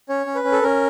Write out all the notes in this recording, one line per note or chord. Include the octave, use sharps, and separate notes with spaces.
C#4 C#5
C#4
B4
C#4
A4
C#4 A#4